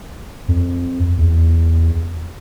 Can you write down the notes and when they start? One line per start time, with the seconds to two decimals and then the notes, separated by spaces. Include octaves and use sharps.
0.48 F2
1.18 E2